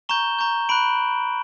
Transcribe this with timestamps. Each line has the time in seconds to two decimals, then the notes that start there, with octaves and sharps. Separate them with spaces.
0.09 A#5 C#6 G6 E7 G7
0.39 A#5 C#6 G6
0.69 B5 F#6 D7 F#7